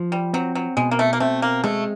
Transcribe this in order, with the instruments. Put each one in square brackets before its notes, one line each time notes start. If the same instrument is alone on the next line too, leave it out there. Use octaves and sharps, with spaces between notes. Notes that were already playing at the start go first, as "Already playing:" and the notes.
Already playing: [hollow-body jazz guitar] F3
[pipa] G3
[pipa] F#3 [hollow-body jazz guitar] C4
[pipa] F#3
[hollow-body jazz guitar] B2 [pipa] G#3
[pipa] A#3
A3
A#3
[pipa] A3 [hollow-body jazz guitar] C4
[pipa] A#3
[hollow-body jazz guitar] G#3 [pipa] A3